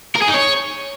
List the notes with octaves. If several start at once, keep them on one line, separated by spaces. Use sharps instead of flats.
A#4
G#4
D#4
C#5